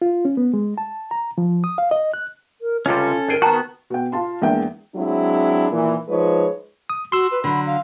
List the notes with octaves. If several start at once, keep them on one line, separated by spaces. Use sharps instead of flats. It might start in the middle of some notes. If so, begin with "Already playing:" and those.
F4
C#4
B3
G#3
A5
A#5
F3
D#6
F5
D#5
F#6
A#4
C#2 C3 G3 C#4 F4 A4
G#1 G#4 A#4 G5
D#3 B3 F#4 G5 A5 A#5
B2 G5
F4 F5 A5 C6
E2 G#3 A#3 D4 E5 G5
F#3 G#3 C4 D4 E4
A#2 D#3 E3
F3 G#3 D#4 B4 C#5
D#6
F#4 C6 E6
B4
D3 F#3 B5
F5